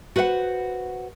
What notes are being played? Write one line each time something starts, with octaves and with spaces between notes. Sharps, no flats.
F#4 B4 C5 E5 F#5